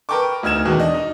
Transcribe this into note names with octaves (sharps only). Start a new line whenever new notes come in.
A#4 B4 G5 A5 C#6 D6
D2 D#4 F6 G#6 E7
E2 B2 D#3 G#3
D4 D#5
D#4